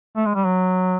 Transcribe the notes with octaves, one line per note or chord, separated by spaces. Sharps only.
A3
G#3
G3
F#3